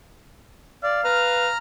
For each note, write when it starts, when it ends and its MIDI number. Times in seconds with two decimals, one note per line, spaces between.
0.83 1.01 74
0.83 1.54 77
1.04 1.49 71
1.04 1.58 82
1.04 1.58 89